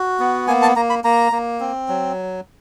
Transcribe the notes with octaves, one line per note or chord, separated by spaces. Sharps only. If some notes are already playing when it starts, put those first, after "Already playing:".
Already playing: F#4
B3
A#3 G#5
A5
A#3 A#5
B5
A#3 A#5
A#3
C4
F#3